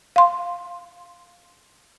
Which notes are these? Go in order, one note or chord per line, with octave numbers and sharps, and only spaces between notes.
F5 C6